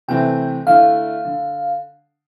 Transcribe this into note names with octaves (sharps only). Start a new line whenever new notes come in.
C3 E3 A3 C4 G5
D3 A3 E4 F5
D3